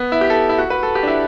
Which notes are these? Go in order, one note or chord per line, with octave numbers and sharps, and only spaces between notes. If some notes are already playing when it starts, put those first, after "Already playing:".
Already playing: B3
E4
G4
A4
E4
F#4
B4
A4
G4
D4
E4